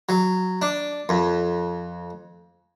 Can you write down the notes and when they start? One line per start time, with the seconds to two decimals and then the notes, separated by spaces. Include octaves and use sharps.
0.09 F#3
0.62 D4
1.09 F2